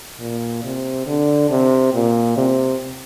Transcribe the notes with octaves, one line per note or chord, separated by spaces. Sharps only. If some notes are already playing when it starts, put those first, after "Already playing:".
A#2
C3
D3
C3
A#2
C3